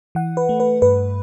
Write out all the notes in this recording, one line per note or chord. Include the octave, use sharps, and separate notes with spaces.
E3 F#5
B4
A3
B4
G2 B4